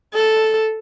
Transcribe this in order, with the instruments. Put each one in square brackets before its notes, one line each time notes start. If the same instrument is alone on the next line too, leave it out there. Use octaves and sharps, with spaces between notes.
[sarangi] A4